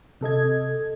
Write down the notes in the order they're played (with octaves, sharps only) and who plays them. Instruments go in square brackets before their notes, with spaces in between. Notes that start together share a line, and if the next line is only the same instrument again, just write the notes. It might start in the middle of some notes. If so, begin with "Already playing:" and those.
[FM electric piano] C3 A4 D#5 G#6